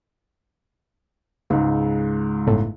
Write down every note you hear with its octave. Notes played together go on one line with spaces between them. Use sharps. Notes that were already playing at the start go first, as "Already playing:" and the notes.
C#2 G#2
G1 A2